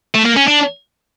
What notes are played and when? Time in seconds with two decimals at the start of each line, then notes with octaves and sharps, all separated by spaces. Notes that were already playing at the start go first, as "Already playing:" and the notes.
0.15 A3
0.25 A#3
0.36 C#4
0.48 D4